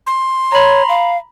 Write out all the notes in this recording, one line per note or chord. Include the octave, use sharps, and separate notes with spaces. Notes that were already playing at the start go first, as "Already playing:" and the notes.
C6
C#5 A#5 B5
F5